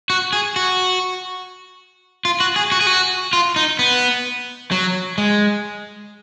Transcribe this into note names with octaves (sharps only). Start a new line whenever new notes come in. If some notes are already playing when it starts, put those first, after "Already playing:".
F#4
G#4
F#4
F4
F#4
G#4
F#4
G#4
F#4
F4
D#4
B3
F#3
G#3